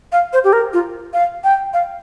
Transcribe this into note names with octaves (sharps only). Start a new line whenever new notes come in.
F5
C5
G4
A#4
F4
F5
G5
F5